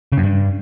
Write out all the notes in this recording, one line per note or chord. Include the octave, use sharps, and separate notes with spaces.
C#3
F#2
G2